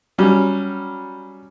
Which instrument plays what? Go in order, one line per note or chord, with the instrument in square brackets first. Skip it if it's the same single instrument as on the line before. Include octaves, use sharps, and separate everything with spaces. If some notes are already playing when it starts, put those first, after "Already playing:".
[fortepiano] F#3 G3 C#4